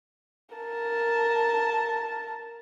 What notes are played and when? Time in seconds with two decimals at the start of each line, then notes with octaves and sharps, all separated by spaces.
0.56 A#4 A5